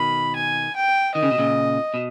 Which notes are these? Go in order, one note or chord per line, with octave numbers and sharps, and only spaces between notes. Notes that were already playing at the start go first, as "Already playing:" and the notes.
Already playing: B2 D#3 B5
G#5
G5
D#3 D#5
C#3
B2
A#2 C#3
B2